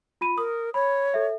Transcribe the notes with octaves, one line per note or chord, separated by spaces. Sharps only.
F4 B5 D#7
A#4 D#6
C#5 B5
A4 E5